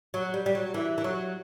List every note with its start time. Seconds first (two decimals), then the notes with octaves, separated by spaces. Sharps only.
0.14 F#3
0.34 G3
0.46 G3
0.55 F#3
0.74 E3
0.98 E3
1.04 F#3